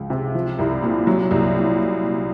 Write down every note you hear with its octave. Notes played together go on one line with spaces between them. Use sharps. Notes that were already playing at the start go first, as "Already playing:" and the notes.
Already playing: C#2 F3
C3
F3
C2
A#2
F#3
C2
A#2